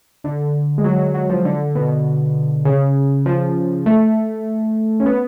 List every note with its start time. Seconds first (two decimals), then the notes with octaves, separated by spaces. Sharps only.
0.24 D3
0.78 G#3
0.84 F#3
0.99 F#3
1.14 F#3
1.30 F3
1.45 D3
1.75 B2
2.65 C#3
3.26 F3
3.86 A3
5.00 C#4
5.06 B3